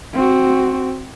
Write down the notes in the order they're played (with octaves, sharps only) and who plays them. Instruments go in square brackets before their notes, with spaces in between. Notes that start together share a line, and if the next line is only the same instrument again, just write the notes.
[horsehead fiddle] C4 F#4